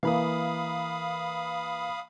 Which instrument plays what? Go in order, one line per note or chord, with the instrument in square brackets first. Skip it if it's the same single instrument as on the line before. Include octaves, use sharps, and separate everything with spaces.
[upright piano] E3 A#3 [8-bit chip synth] F5 B5 D#6